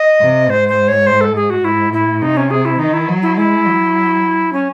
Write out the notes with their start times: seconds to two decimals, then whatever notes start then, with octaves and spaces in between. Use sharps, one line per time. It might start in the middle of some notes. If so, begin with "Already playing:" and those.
Already playing: D#5
0.21 C3
0.49 G#2 C5
0.69 C5
0.88 C#5
1.07 C5
1.21 A4
1.36 G#4
1.50 F#4
1.64 G#2 E4
1.93 A2 E4
2.21 C3 D#4
2.37 C#4
2.51 G#4
2.65 E4
2.79 D#3 D#4
2.93 E4
3.09 F#3
3.22 E4
3.37 G#3 E4
3.65 F#3
4.53 C#4